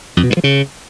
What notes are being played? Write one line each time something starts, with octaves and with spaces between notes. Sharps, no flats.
F2
B2
G2
F3
C#3